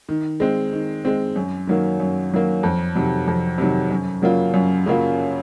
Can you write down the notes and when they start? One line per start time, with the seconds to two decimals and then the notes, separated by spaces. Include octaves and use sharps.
0.09 D#3
0.40 G#3 C4
0.73 D#3
1.05 G#3 C4
1.36 F#2
1.67 D#3 F#3 A#3
2.00 F#2
2.31 D#3 F#3 A#3
2.63 F2
2.95 C3 D#3 F#3
3.28 F2
3.58 C3 D#3 F#3
3.90 F#2
4.22 C#3 F#3 A#3 F4
4.54 F#2
4.86 C#3 F#3 A#3 F4